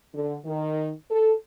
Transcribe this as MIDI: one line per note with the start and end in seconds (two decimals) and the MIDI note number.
0.14 0.35 50
0.45 0.90 51
1.10 1.33 69